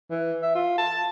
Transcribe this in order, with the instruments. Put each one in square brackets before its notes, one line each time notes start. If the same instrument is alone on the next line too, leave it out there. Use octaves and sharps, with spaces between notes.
[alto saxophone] E3
E5
F4
A5